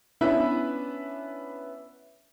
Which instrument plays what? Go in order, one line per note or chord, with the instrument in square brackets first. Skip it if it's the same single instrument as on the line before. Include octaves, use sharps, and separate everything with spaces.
[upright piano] B3 C#4 D4 E4 B4 E5